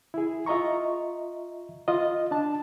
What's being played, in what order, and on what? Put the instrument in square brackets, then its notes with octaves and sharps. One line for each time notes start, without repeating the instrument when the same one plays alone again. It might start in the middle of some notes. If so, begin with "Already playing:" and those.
[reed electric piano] E4 G#4
F4 D#5 E5 A#5 C#6
F4 D#5
D4 A5